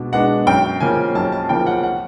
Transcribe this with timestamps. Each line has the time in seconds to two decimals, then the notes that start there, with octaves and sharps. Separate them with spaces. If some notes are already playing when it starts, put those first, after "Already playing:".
Already playing: B2 G#3 B3 D4
0.12 G#3 B3 D4 F#5
0.47 F#2 G5
0.80 C#3 F3 A#3 G#5
1.15 F#2 A5
1.32 A5
1.49 C#3 F3 A#3 G5
1.67 F#5
1.83 F#5